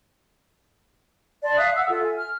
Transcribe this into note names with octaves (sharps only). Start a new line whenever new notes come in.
D5 A5 C6
E5 F5 D#6 F#6
F#5 E6
F4 A4 E5
G#5
F6